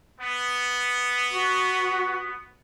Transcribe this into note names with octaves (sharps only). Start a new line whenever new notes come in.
B3
F#4